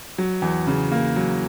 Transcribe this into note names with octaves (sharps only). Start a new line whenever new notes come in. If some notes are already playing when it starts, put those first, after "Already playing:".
F#3
E2
C#3
A#3
F#3